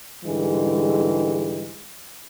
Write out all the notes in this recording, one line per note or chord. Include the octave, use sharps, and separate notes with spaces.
G#2 D3 E3 G3 G#3